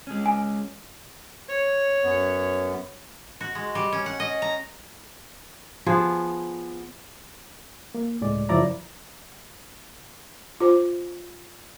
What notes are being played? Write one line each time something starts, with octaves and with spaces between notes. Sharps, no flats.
G#3 C#4
G#5
C#5
F#2 B3
F#4
G#3
G3
C#4
F#5
D#5
A#5
F3 B3 G#4
A#3
C#2 A2 G#3 D5
F#2 C#3 F3 E4 D5 A#5
F4 C5